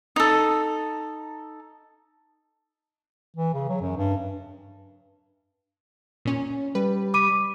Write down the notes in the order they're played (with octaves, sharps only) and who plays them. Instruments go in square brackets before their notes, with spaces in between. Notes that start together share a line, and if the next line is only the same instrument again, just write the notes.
[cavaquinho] D#4 A4
[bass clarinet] E3
C#3
F#3
F#2
G2
[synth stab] A#2 C#4
[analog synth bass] G3 [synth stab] B4
[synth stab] B5 [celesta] D6 D#7